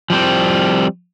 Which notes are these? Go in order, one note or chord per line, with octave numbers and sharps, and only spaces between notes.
F3 G3 C4